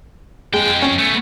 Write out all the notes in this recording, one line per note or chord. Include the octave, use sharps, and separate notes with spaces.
F2 G#3 G5
C#4
A3 B3